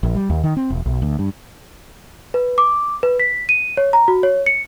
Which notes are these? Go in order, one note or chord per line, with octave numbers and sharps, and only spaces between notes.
A#1
G3
D#2
D#3
C4
E1
B1
D2
G2
B4
D6
B4
B6
D#7
C#5
A#5
F#4
C#5
C#7